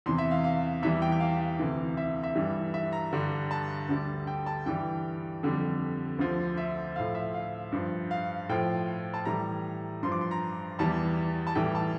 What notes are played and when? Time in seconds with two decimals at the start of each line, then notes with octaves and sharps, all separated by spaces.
0.06 E2 C3 E3 C6
0.18 E5
0.31 F5
0.44 F5
0.83 E2 E3 G3 E5
1.02 G5
1.12 G5
1.20 F5
1.59 D2 C3 E3
1.97 E5
2.24 E5
2.35 G2 E3 G3
2.74 E5
2.93 A#5
3.12 G2 D3 G3
3.51 A5
3.89 D2 D3 G3
4.27 G5
4.46 A5
4.66 G2 E3 G3 G5
5.43 F2 D3 G3
6.19 D2 D3 F3
6.57 E5
6.96 A2 F3 F5
7.15 E5
7.34 F5
7.72 G2 F3
8.11 F5
8.49 A2 F3 G5
9.14 A5
9.25 A2 E3 G3 A#5
10.03 G2 F3 C6
10.12 D6
10.21 C6
10.31 A#5
10.79 E2 E3 G3 A5
11.47 A5
11.55 A2 E3 G3 G5
11.75 A5